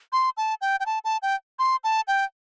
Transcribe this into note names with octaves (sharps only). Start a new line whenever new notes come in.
C6
A5
G5
G5
A5
A5
G5
C6
A5
G5